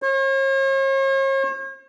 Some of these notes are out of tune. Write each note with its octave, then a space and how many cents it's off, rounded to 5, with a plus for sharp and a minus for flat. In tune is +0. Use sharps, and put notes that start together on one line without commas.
C#5 -45